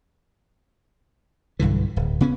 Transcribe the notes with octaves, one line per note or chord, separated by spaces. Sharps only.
B1 G2 D3 E3
D1
C#3 B3 C#4